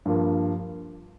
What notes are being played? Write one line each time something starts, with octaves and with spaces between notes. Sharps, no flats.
G2 F3 A#3